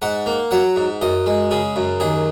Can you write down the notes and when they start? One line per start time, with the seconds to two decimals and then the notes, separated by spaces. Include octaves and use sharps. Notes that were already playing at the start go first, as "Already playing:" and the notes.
0.02 G#2 F#5
0.26 A#3
0.51 F#3 F#5
0.76 G#2
1.01 F#2 D#5
1.26 G#3
1.51 C#3 G#4
1.76 F#2
2.00 D#2 G#4